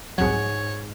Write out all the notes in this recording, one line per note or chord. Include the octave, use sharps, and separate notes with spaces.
C2 F2 G#2 F#3 G#4 C#5 F#5